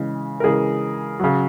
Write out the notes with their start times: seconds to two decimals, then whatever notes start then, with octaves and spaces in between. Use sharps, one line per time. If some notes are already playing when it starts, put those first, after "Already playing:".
Already playing: C#3 E3 G#3
0.40 A#4
0.44 C#3 E3 G#3 G#4
1.19 C#3 F#3